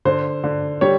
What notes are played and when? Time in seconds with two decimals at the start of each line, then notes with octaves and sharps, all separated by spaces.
0.05 D3 C5
0.44 D3
0.81 G3 C#5